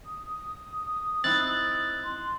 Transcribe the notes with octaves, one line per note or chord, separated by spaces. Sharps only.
D#6
C4 D#4 E4 F#6 A6
C6